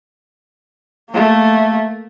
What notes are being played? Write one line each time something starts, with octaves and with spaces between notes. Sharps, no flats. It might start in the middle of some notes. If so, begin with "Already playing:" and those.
A3 A#3